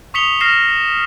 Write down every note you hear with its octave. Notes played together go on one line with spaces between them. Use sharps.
C#6 D#6 B6 C#7 F7 G7
F6 A#6 C7 E7 F7